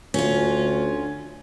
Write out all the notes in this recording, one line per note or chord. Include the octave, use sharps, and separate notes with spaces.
D2 C#4 F4